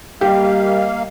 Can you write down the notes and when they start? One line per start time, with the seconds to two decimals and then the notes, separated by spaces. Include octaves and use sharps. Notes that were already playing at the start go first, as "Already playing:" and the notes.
0.21 G3 A#3 G4 D#5 F5